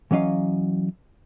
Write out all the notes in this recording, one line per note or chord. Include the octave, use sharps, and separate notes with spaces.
E3 F#3 C#4 D#5 F5